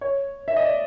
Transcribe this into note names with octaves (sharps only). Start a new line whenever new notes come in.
C#5
E5
D#5
D5